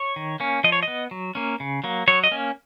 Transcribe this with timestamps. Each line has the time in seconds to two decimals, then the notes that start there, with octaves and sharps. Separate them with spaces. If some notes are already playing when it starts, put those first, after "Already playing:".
Already playing: C#5
0.16 D#3
0.40 A#3 C#4
0.64 F3 D#5
0.72 C#5
0.83 D#5
0.88 B3
1.11 F#3
1.35 A#3 C#4
1.60 C#3
1.84 F#3 A#3
2.08 F#3 C#5
2.24 D#5
2.31 A#3 C#4